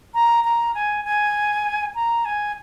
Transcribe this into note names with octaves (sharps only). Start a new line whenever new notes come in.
A#5
A#5
G#5
G#5
A#5
G#5